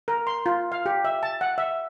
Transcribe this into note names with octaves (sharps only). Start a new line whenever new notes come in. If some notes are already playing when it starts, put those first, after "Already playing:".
A#4
C6
F4
F5
G4
E5
A5
F#5
E5